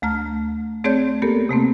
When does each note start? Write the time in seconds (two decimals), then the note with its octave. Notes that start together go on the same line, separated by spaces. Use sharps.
0.02 D2 A3 A#5 F6
0.84 A3 C4 G#4 C#5 D5 G6
1.22 A#3 B3 G4 A4 A#4
1.49 C3 A3 A#3 C4